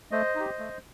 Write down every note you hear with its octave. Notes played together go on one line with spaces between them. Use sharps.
A3 C5 D#5
D#4 G4
A3